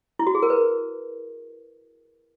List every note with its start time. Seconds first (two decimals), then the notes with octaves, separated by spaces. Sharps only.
0.19 E4
0.27 F#4
0.35 G#4
0.43 A#4
0.50 B4